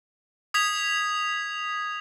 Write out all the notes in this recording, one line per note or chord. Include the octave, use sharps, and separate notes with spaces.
D#6 G#6 B6 F7